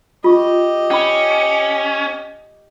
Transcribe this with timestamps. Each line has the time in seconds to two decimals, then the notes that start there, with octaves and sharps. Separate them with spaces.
0.24 F4 G4 D#5 C#6
0.91 C#4 G5 B5